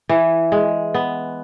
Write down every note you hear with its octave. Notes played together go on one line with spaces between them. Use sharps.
E3
G#3
B3